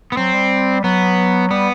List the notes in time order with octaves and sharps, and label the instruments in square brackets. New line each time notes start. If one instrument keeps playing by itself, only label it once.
[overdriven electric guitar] B3
[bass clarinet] F#3 [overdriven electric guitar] C4
[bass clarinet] G3
[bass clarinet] F#3 [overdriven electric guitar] B3
[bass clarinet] G3 [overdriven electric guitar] B3